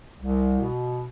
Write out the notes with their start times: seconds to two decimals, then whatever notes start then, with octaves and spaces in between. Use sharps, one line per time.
0.21 C2
0.60 B2